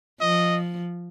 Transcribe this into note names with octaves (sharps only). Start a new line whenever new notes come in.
F3 D#5